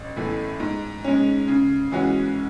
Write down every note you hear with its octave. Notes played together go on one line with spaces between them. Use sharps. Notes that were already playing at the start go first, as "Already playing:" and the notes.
Already playing: A1
A2 E3 A3
G#2
G#3 C#4
C#3
E3 G#3 C#4 F#4